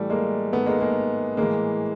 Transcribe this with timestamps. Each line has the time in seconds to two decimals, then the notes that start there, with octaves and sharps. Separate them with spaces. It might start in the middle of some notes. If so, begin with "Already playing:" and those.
Already playing: A2 E3 G3 A3
0.10 G#3 A#3
0.52 G#2 D#3 A3 B3
0.66 G#3 A#3
0.81 G#3 A#3
1.37 A2 E3 G#3 A#3